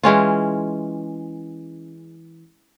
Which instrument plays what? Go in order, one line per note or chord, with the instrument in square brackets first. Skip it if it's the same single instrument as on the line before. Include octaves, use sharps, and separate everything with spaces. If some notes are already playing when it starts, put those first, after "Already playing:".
[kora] E3 G#3 C#4 F4